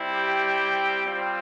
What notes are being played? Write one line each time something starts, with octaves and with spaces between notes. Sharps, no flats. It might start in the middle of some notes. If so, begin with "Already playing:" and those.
Already playing: G3 C4 E4
G4
G3 C4 F4